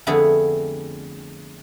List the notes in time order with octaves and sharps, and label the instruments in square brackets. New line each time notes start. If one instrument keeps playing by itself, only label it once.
[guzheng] F2 D3 A3 B3 G#4